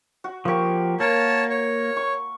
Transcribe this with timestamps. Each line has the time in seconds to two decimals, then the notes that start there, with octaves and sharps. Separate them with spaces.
0.24 F#4
0.45 F3 A#3 G4 C#6
1.00 A#3 A#4 C#5 A5
1.50 C#5
1.97 C#6